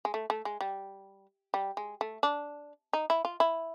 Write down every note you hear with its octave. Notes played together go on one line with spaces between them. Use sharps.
G#3
A3
A3
G#3
G3
G3
G#3
A3
D4
D#4
E4
F4
E4